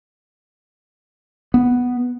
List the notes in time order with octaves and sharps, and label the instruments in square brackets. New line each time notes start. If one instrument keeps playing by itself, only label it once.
[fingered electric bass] B3